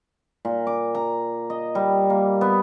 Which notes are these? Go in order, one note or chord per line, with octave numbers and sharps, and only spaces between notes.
A#2
D6
A#5
D#5
G3
A#3
B3